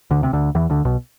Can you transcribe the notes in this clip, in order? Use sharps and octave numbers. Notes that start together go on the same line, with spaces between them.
D2 D3
C3
D2 D3
E2 E3
D2 D3
B1 B2